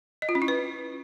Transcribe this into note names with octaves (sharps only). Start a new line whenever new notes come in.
D#5
F4
C#4
E4
B4